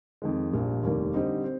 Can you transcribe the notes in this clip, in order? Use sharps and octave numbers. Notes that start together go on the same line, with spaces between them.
F2 D#3 G#3
A#1 A#2 G3
F1 D#2 D#3 G3 A#3
D3 G3 C4 D#4
C4